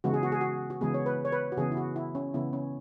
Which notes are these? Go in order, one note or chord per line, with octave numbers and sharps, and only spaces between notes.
C#3 E3 G#3 B3 F#4
G#4
F#4
G#4
F#4
F#4
C#3 E3 G#3 B3 G#4
C#5
B4
C#5
B4
F#4
C#3 E3 B3 G#4
E4
F#4
E4
C#4
C#3 E3 B3 E4
C#4